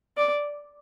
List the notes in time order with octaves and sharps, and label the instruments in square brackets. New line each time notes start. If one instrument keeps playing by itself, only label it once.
[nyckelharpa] D5